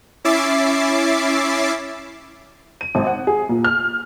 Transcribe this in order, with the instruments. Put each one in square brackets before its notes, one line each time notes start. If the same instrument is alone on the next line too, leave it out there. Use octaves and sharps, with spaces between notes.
[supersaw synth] C#4 E4 E5 D6 A6 C7
[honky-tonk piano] D#7
G#1
F#5
G#4
A#2
F6